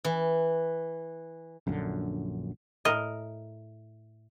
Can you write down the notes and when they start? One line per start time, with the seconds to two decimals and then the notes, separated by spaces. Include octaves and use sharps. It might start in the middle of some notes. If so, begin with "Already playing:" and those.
0.04 E3
1.67 A#1 F#2 D3
2.85 A2 A#4 D#5